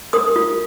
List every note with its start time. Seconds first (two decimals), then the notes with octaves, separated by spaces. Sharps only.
0.13 A#4 D#6
0.36 F4